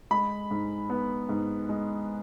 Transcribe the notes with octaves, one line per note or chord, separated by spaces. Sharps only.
G#3 B5
G#2
B3
G#2
G#3